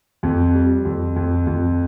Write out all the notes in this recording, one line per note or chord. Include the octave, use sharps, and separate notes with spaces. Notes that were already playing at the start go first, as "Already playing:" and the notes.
F2
G3
F2
F2
F2